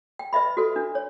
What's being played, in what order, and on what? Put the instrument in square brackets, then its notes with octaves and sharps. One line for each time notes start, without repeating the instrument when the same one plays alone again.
[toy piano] G5
B4 D#5 E5 B5
F#4 A4 B4
D4
C#5